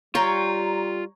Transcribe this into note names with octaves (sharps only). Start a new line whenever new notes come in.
G3 F4 C#5 G5 A#5